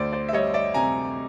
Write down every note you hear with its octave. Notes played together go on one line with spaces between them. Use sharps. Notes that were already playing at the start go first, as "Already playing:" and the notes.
Already playing: D2 C5 D5
C5 D5
E5
G3 C#5 D#5
D5 E5
C3 G#5 A#5